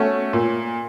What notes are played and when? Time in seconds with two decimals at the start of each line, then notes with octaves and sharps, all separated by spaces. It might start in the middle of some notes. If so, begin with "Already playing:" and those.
Already playing: A3 C#4 F#4
0.33 A#2